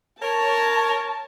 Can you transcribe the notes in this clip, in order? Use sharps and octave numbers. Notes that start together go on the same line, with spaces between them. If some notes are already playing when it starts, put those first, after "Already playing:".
A#4 C#5 A5